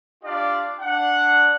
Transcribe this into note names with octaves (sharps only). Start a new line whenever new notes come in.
D4 F4 G4 D5 F5
D4 F#5